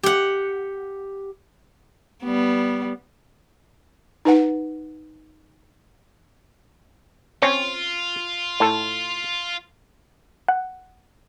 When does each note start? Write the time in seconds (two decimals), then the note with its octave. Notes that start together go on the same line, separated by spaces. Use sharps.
0.03 G4 F#5
2.24 G3 B3
4.25 D#4 B4 F#5
7.42 C4 C#4 F4 C#5
8.60 A2 A4
10.48 F#5